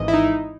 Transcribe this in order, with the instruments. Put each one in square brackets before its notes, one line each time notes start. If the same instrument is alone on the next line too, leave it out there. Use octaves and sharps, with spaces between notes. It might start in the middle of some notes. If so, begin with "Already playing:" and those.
Already playing: [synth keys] G#1 G#2 E3 D#5
E4
D#4